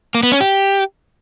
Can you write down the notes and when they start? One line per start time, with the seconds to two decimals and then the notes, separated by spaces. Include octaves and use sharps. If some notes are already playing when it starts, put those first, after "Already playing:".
0.15 A#3
0.23 B3
0.32 C#4
0.40 G4